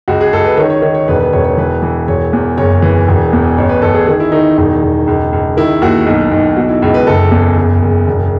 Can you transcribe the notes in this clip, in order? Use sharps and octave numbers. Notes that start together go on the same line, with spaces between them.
C#2 F#4
G#4
C#2 A4
B4
D#3 C#5
C#5
D#3 C#5
C#5
E1 B4
B4
E1 C#5
C#5
E3 B4
E3
E1 C#5
E2
F#1 C#5
E3
E1
E2
A1 C#5
B4
A1 A4
G#4
D#3 G#4
E4
D#3 D#4
E1 D#4
E1
C#2
C#2
D#3 E4
D#2 F#4
B1
B1
B2 F#4
E4
C#2
B4
F#1 A4
E2 G#4
F#1
F#1
E1